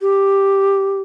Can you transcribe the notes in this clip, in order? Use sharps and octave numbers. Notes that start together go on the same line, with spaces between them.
G4